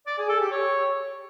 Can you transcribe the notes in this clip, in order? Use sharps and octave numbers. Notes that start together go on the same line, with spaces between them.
D5
G#4
A4
G4
C#5